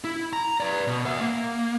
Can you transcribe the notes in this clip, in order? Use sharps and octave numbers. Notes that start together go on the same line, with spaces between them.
E4
A#5
B4 D5
B2
E5 F#5
A#3